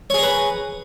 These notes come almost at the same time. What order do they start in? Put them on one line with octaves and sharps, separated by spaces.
C#5 G#4 A#5 B4